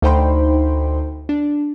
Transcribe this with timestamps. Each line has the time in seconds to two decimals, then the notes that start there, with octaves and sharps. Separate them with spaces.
0.02 D2 D#4 C5 G5 B5 C6
1.29 D4